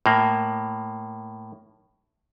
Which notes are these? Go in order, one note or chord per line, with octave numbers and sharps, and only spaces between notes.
A2 A#3